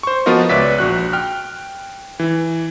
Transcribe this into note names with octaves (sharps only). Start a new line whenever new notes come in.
C5 C#6
F3 B3 F4 F#4 A#4 D#5
C#2 B4 C#5 D5 E5 B6
A#1 F#4 F#6
G5 F6
E3